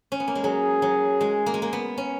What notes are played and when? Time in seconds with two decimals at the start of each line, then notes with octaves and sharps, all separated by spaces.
0.12 C#4
0.20 B3
0.28 A#3
0.35 G#3
0.44 F#3 G#4
0.82 F#3
1.21 G#3
1.46 A#3
1.54 G#3
1.62 A#3
1.73 B3
1.97 C#4